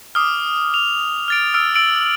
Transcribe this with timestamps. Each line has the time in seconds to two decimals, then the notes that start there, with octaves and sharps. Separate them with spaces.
0.15 D6 D#6 F6
0.74 F7
1.28 F6 A6 D7
1.54 E6 F6 D7
1.75 E6 D7 F#7